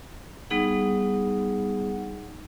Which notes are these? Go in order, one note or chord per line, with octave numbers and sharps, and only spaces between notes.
G3 B3 D#4 G#4 F#5